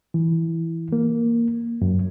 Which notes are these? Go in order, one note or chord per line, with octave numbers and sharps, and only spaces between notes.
E3
A#3
F#2